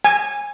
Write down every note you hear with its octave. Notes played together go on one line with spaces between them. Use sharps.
G#5